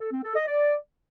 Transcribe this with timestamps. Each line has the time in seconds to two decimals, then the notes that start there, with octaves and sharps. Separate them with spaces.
0.01 A4
0.12 C4
0.24 A4
0.36 D#5
0.47 D5